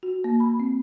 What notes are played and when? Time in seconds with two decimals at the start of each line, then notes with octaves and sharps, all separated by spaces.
0.03 F#4
0.24 A#3
0.40 B5
0.60 C4